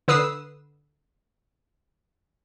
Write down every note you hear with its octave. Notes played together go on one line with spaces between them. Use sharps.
D3 B4 D#6 E6 C7 E7